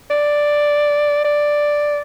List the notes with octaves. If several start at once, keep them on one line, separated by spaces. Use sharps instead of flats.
D5
D5